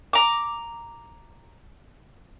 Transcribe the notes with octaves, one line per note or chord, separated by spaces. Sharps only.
A#5 D6